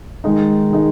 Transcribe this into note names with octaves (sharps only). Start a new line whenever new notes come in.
D#3 G#3 D#4
D#3 G#3 D#4